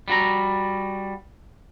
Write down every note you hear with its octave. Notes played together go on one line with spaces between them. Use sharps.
G3 F#4 A#5